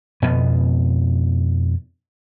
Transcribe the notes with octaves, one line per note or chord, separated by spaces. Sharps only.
F2 B2 B3